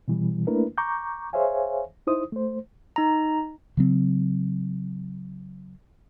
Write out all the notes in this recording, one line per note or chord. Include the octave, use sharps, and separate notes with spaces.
B2 E3 G3
A3 A#3 D4 E4 A#4 B4
A#5 C#6 D6 G6
G#4 C5 C#5 E5 F5 G#5
D#4 E4 C5 D#6
A3 C5
D#4 A#5
C#3 F#3 C4